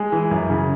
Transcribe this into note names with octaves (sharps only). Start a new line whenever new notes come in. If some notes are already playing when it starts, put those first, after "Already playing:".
Already playing: G#3
E3
F#2
C#3